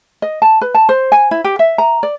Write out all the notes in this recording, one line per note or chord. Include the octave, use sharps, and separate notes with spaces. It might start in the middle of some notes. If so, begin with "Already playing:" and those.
D#5
A5
B4
A5
C5
G#5
E4
G4
E5
A#5
D5